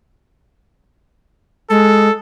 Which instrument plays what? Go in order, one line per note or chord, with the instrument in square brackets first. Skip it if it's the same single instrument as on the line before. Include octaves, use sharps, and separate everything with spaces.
[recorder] G#3 [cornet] A4